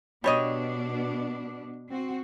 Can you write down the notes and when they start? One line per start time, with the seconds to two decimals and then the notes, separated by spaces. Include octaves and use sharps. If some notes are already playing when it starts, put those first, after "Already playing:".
0.24 B2 G3 B3 D4 C#5 D#5
1.89 C4 F#4